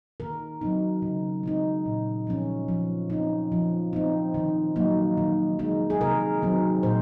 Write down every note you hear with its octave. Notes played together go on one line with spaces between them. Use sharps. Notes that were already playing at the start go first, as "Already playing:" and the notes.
D#3 A#4
F#3 C4 D#4
C#3
G#3 C4 D#4
A#2
F3 G#3 C#4
F3
C4 D#4
F3
C4 D#4
D#3
F#3 A#3 D#4
D#3
G#3 D#4
G#4
C3 A#4
D#3 F#3 C4 D#4
A#2 C5